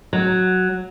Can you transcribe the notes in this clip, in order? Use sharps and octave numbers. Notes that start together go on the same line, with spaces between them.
F#3